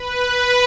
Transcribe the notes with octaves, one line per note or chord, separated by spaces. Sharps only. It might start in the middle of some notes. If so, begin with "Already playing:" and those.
Already playing: B4